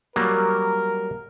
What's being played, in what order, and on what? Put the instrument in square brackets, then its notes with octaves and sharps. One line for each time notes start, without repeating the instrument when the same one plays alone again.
[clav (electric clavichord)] F#3 G3 A#3 [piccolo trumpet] A#4